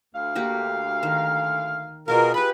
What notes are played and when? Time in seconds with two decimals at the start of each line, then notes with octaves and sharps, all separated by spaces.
0.14 D2 F5
0.35 A#3 F#4 G4
1.03 D#3
2.08 B2 F4 G#4 A#4 F5
2.34 G4 B4 B5